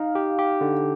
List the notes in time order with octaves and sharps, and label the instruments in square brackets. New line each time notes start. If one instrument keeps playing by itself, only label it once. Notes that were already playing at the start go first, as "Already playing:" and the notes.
Already playing: [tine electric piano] D#4 [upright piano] F5
[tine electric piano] G4
G4
D3